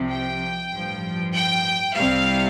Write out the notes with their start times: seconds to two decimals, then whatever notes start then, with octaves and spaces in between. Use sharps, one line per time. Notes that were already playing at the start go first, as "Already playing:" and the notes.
Already playing: C2 C3 F3
0.09 G5
0.71 A1 G2 F3
1.34 G5
1.96 C2 C3 G3 F5